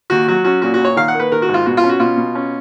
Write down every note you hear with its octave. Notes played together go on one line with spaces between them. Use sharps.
D#2 F#4
F#3 F#4
C#4 F#4
A#2 F#4
F#4
A#2
C#5
D#3 F5
F#5
A#3
B4
D#3 A#4
F#4
G#2
F4
B2 F#4
F4
C#4
F#4
B2 F4
B2
C#4